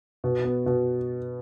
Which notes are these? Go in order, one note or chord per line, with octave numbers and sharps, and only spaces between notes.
B2
B3
B2